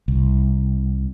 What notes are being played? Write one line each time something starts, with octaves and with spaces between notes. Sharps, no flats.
C2